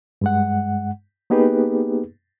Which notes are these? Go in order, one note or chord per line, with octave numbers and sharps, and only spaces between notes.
G2 G#3 F#5
A#3 B3 D#4 G4 G#4 B4